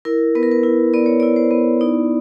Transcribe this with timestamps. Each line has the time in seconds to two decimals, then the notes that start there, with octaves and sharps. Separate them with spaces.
0.05 E4 A#4
0.35 B3 B4
0.43 A#4
0.51 B4
0.63 E4
0.94 B3 D5
1.06 C#5
1.20 E4 D5
1.36 C5
1.51 B3
1.81 D#4 D5